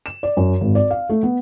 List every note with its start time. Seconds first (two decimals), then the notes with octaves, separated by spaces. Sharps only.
0.06 E7
0.23 D5
0.37 F#2
0.61 G#1
0.75 D5
0.90 F5
1.10 A3
1.23 B3